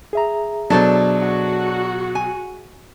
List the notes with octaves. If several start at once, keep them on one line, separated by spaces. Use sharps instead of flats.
G#4 E5 A#5
B2 F#3 D4 A4 C5
F#4
G#5